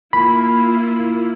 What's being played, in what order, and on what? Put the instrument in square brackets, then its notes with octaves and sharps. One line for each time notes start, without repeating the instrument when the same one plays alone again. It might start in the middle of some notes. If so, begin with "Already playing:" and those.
[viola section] A#3 E4 F4 [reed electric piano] B5